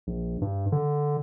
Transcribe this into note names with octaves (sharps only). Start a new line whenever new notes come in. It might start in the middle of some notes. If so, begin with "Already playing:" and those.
A#1
G2
D3